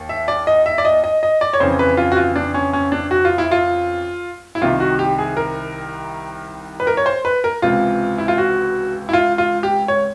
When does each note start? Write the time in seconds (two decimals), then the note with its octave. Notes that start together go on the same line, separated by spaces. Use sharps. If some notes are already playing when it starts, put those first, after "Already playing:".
Already playing: D#2
0.09 E5
0.28 D5
0.47 D#5
0.66 E5
0.78 D5
0.85 D#5
1.04 D#5
1.23 D#5
1.41 D5
1.53 C#5
1.60 F2 C#3 E3 C5
1.79 B4
1.97 F4
2.12 F#4
2.17 F4
2.36 D4
2.54 C#4
2.73 C#4
2.92 D4
3.11 F#4
3.25 F4
3.38 E4
3.51 F4
4.55 E4
4.61 C2 C3 D#3 F4
4.80 F#4
4.99 G4
5.18 G#4
5.37 A#4
6.80 B4
6.87 A#4
6.97 C#5
7.06 C5
7.25 B4
7.44 A#4
7.62 C#2 C3 E3 F4
8.18 E4
8.28 F4
8.38 F#4
9.09 E4
9.13 F4
9.38 F4
9.63 G4
9.88 C#5